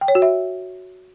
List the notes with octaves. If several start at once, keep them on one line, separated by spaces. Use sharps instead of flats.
G5
C#5
F#4
E5